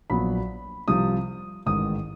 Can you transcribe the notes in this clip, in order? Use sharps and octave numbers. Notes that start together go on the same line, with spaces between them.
A#1 A#2 F#3 B3 B5
C2 C3 F3 D#6
A1 G#2 D#3 D#6